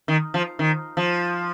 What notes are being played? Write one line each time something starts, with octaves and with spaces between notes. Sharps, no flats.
D#3
F3
D#3
F3